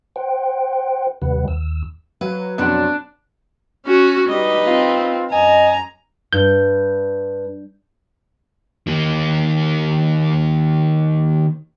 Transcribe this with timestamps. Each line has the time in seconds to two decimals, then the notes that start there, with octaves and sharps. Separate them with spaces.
0.16 C5 F#5 G5
1.22 D#2 C3 G3 B4 F#5
1.48 D#2 E6
2.21 F#3 B4 F5
2.58 F2 B2 F3 B3 D4 F#5
3.86 C#4 F#4
4.28 G3 D#4 B4 D#5
4.67 C4 F4
5.32 F#2 D#5 G#5 A#5
6.33 G2 G6
8.87 D#3 A#3